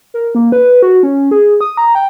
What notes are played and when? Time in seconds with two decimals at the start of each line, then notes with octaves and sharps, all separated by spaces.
0.14 A#4
0.35 A#3
0.52 B4
0.83 F#4
1.03 C#4
1.31 G#4
1.61 D#6
1.77 A#5
1.95 G5